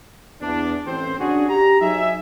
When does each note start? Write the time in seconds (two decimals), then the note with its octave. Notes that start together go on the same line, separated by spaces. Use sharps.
0.42 E2 D4
0.87 A1 C4 C5
1.19 C#3 D4 F#4 G#4
1.49 G4 A#5
1.81 F#3 D#4 G#4 E5